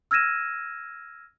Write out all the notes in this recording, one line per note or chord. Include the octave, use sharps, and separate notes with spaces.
E6 F6 G#6 A#6 D#7 E7